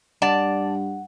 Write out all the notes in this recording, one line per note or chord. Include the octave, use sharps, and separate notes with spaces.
G2 D5 F#5 A5